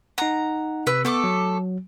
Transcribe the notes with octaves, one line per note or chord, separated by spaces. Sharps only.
D#4 F#5 A#5
C3 B4 E6
A3 B3 A4 D6
F#3